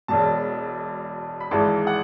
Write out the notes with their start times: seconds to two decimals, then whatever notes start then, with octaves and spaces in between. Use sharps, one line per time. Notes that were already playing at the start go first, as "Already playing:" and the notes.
0.08 E1 E2 B2 A5
1.40 B5
1.51 G#1 G#2 E3 G#3 A5
1.87 F#5